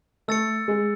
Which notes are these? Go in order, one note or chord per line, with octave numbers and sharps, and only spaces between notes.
A3 E6 A6 C#7
G#3